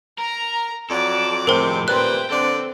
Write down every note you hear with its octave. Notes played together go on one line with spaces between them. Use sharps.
A#4 A#5
F2 F#3 A4 D5 D6
F2 A2 C3 G#3 C4 A#4 C5
A#2 G3 B4 C5 E5 G5 C6 F#6
D3 C4 A4 D5